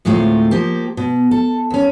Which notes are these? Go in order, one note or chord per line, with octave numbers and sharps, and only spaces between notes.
D2 A2 C3 G#3 A3 F4
F3 A#3 G4
B2
A4
D#2 C#4